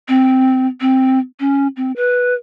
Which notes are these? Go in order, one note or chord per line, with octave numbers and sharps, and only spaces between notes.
C4
C4
C#4
C4
B4